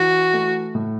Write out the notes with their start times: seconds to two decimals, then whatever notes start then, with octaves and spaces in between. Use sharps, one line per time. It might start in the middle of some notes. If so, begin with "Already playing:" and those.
Already playing: E3 F#4
0.33 A3
0.75 A2